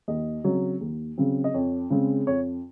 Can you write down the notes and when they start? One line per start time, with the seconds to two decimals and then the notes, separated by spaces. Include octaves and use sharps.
0.08 D#2 D#5
0.44 C#3 F#3 C4
0.81 D#2
1.18 C#3 F#3 C4
1.44 D#5
1.54 F2 C#5
1.90 C#3 G#3 C4
2.27 F2 C#5